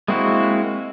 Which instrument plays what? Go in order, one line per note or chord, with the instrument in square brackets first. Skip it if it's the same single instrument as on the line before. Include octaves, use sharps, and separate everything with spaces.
[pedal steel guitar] G#3 A#3 C4 E4 F#4